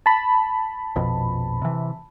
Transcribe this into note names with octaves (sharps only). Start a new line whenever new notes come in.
A5 B5
A#1 F2 B2
C3 E3